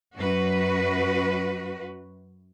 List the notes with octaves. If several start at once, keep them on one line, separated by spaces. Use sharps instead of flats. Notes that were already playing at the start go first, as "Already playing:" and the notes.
F#2 F#4 B4